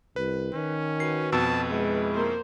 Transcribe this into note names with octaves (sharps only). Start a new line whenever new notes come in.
C2 B4
D#3 C#4
F#4 B4 C7
F2 B2 A5 E6
G#3 E4
A#3 A#4 C5